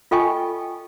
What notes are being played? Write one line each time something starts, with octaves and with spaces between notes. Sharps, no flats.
F4 A4 D#5 G5 G#5 C#6